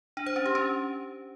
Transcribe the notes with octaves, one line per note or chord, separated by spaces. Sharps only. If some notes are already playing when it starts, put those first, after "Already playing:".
D4
C5
C#4
G4
C#4